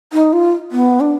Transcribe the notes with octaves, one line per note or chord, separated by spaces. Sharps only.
D#4
F4
B3
D4